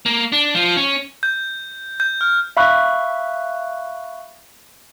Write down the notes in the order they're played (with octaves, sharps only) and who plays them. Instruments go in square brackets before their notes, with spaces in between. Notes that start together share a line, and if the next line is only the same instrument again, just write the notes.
[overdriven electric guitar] A#3
D4
F3
C#4
[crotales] G6
G6
F6
[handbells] E5 F5 B5 C#6 F#6